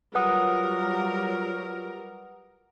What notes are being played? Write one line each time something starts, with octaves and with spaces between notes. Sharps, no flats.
F#3 G3 F4 A#4 B4 F#5 D#6